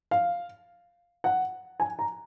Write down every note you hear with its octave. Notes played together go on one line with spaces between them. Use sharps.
F5
F#5
G#5
A#5